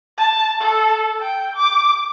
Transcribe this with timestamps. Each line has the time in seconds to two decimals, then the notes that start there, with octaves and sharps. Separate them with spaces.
0.18 A5
0.61 A4
1.21 G5
1.56 D6